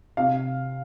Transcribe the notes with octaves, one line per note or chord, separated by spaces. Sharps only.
C3 F5